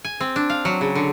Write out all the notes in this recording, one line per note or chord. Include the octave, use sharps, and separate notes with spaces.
G#5
C4
D4
F5
F#3
C#3
D3